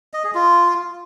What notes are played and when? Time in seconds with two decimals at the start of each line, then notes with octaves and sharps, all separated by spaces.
0.14 D#5
0.24 G#4
0.35 F4